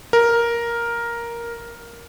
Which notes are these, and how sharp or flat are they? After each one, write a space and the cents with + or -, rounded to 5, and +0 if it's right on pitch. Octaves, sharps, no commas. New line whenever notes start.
A#4 +5